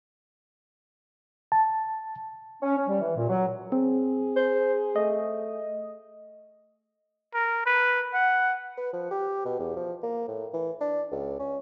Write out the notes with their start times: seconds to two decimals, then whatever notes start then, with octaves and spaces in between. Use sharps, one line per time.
1.52 A5
2.62 C#4
2.76 C#4
2.88 G3
3.01 E3
3.16 A#2
3.28 F#3
3.72 C4 G#4
4.36 C5
4.96 A3 D#5
7.34 A#4
7.66 B4
8.14 F#5
8.77 B4
8.93 F3
9.11 G4
9.45 B2
9.59 E2
9.76 F3
10.03 A#3
10.28 A2
10.53 E3
10.81 D4
11.11 C#2
11.40 C#4